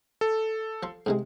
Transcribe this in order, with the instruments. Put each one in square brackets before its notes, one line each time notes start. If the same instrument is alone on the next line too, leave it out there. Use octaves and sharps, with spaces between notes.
[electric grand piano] A4
[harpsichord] F3 C6
G#2 C3 G#3